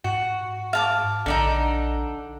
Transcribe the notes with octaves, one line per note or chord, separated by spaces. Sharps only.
G#2 F#4
F5 A5 D6
A#1 D3 D4 D#4